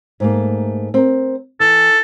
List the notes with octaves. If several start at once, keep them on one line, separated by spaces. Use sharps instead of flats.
G#2 A3 A#3
C4 A#4
E3 A4